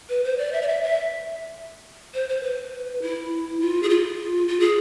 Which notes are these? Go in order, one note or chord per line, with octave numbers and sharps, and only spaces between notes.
B4
C5
D5
E5
D5
E5
E5
C5
C5
B4
E4
F4
G#4
F4
F4
G#4